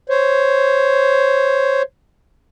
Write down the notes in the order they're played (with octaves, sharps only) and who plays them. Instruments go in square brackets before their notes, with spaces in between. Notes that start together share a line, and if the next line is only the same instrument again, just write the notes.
[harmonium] C5 C#5